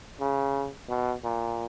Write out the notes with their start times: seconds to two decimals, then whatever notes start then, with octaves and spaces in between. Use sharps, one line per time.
0.20 C#3
0.89 B2
1.24 A#2